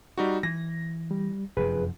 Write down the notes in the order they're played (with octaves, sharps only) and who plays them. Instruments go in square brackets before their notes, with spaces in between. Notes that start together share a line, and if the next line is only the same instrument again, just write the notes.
[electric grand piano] G3 D#4 F#4
[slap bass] E3 [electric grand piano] A#6
[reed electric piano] G3
[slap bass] F1 F#2 C3 [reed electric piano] G#4 B4